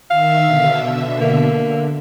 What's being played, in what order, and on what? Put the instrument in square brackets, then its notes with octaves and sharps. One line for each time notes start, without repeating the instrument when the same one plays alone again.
[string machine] D#3 E5 E6 [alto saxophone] F5
[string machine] B2 D3 E5
[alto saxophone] A#3
[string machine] D3